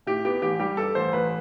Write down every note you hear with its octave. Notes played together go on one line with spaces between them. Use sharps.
A2 G4
B3 G4
A1 G4
G3 G4
G2 A4
A1 C5
A1 B4